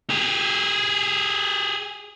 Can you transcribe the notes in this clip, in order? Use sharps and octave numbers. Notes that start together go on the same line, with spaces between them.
G4 G#4